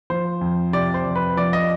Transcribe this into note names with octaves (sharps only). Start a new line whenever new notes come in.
F3 C5
F2
C3 D5
C5
F2
B4
F3 D5
D#5